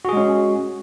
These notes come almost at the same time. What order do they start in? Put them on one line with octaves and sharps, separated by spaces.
F#4 G#4 G#3 C#4